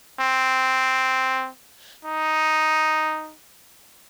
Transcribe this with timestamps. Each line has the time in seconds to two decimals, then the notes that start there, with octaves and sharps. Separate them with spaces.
0.20 C4
2.05 D#4